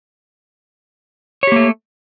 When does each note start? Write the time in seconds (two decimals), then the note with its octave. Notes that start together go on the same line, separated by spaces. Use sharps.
1.43 C#5
1.47 G4
1.52 A#3
1.56 A3